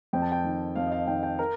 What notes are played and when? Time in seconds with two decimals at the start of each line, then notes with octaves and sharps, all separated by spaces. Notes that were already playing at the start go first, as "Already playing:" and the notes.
0.13 F2 G5
0.22 A5
0.32 G5
0.44 D#3
0.75 F2 F5
0.86 D#5
0.92 F5
1.07 D#3 G5
1.23 G5
1.39 A#4